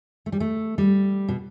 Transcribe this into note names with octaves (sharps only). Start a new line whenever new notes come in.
A3
G3
A3
G3
B2